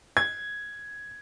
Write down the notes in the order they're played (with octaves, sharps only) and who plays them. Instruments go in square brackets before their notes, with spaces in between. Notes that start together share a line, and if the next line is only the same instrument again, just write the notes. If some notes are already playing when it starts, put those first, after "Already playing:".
[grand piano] G#6